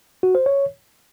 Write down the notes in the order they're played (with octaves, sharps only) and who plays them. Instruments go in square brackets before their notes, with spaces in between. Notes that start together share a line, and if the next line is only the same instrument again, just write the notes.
[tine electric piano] F#4
C5
C#5